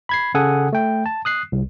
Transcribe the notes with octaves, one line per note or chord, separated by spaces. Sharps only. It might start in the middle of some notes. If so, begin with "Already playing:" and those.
B5 G#6 C7
C#3 A4 F#5 G#5 D#6
A3 G5
A5
D#6 F#6 C7
C2